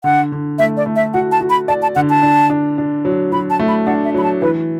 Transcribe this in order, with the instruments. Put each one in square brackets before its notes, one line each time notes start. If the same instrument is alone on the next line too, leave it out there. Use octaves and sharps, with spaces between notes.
[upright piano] D3 [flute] F#5
[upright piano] D3
[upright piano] A3 [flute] E5
[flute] D5
[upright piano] A3
[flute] E5
[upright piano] F#4 [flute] F#5
[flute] A5
[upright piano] F#4
[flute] B5
[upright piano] D5 [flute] A5
[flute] A5
[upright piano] D3 [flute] F#5
[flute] A5
[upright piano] D4
D4
D4
F#3
[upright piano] F#3 [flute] B5
[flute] A5
[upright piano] A3
[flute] B5
[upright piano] D4 [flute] F#5
[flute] E5
[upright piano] F#3 [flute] B5
[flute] A5
[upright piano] E3 [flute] B4